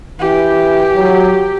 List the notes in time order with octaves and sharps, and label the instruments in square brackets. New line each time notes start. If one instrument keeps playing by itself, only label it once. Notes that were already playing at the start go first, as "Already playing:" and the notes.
[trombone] E3 [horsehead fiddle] G4
[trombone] F#3